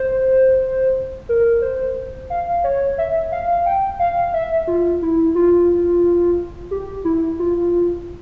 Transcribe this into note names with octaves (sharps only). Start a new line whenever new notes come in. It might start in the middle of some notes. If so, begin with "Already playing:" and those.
Already playing: C5
A#4
C5
F5
C#5
E5
F5
G5
F5
E5
F4
E4
F4
G4
E4
F4